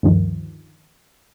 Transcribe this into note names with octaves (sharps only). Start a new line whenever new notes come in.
D2 G2 D#3 F3